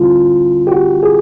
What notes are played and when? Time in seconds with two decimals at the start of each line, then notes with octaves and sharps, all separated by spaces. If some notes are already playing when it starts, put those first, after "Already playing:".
Already playing: D2 D3 G3 C4 E4 F4
0.67 G4
0.72 F#4
1.03 G#4